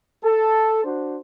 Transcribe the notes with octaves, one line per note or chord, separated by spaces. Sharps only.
A4
D4 F#4 C5